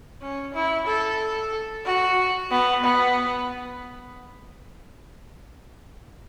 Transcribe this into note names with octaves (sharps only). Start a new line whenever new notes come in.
C#4
E4
A4
F#4
B3
B3